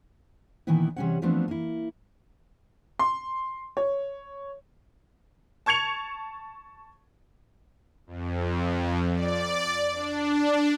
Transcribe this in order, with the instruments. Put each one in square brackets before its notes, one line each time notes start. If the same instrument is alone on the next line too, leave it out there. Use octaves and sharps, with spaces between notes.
[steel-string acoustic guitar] A#2 D#3 E3 A#3 B3 E4
C3 E3 G3 C#4 C#5 F#5
E3 F3 A3 B3 C4 D4
A#3 E4
[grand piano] C6
C#5
[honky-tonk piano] A5 C#6 G#6 C#7 F7
[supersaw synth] F2
D5
D4